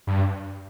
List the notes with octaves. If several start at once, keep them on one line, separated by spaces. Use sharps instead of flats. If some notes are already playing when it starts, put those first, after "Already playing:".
G2